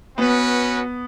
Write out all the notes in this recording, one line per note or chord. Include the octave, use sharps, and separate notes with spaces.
B3 C#4 F#4 B4